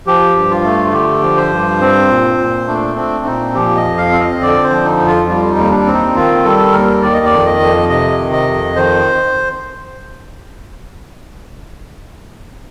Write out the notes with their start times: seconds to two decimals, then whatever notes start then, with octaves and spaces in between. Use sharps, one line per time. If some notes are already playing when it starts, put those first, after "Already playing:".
0.06 F3 G4
0.36 G2
0.51 F4
0.64 A3
0.89 F4
0.93 D3 G4
1.23 F3
1.37 C5
1.52 G2
1.81 C4
2.09 A#2
2.38 A#2
2.67 A3 D4
2.96 C4 D4
3.25 A#2 D#4
3.54 F3 G4
3.76 D#5
3.84 F2
3.98 F5
4.12 C4
4.20 D#5
4.42 D3 D5
4.64 C5
4.70 F3
4.85 D#4
5.00 F2
5.07 F4
5.28 G3 F4
5.45 F4
5.50 D#4
5.58 D#2
5.71 D4
5.86 C4
5.93 D#4
6.15 D#3 F4
6.44 G3 A4
6.73 D#2 A#4
7.02 D#3 D5
7.14 D#5
7.25 D5
7.31 F2
7.46 D#5
7.60 F2
7.89 C3 D#5
8.18 D#3
8.32 D#5
8.47 F2
8.76 D#3 C5